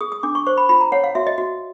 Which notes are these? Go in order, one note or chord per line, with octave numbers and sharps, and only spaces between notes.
G#4 D#6
D#6
D4 D6
C#6
C5 C#6
B5
F4 B5
A#5
C#5 F#5
F5
F#4 E5
D#5
F#4